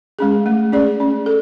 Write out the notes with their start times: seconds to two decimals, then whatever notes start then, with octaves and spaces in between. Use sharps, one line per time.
0.19 G#3 C#4 G#4
0.46 A3
0.72 C#4 G#4 D5
1.00 C#4
1.26 A4